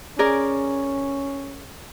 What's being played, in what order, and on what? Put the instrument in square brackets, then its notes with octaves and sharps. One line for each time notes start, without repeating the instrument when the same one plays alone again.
[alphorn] C#4 [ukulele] G#4 A#4 D5